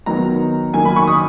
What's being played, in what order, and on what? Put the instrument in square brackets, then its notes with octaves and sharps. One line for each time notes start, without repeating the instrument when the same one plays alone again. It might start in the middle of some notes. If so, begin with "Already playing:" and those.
[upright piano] D#3 F#3 B3 A#5
D#3 F#3 A#3 G#5
B5
C#6
D#6